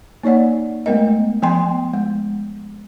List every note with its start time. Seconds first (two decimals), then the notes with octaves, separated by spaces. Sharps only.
0.23 A#3 D#4 C#5 D5 F#5
0.86 G#3 A3 B3 A#4 D#5
1.42 F3 B3 G5 G#5 C6
1.94 G#3